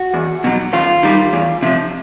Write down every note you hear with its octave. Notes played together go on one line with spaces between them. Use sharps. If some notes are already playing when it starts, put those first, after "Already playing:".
Already playing: F#4
E2
B2 F#3
D#2 F4
D#3 G3
E2
C3 F3